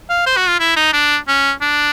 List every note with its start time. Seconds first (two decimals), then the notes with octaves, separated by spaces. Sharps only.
0.09 F5
0.26 C5
0.37 F#4
0.48 F4
0.60 E4
0.76 D#4
0.93 D4
1.28 C#4
1.61 D4